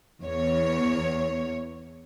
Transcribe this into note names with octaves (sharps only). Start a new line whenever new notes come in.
E2 C#5